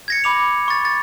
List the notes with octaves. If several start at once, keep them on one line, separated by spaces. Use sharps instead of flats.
G#6 A#6 C#7
B5 D6 F7
C#6 A6
A6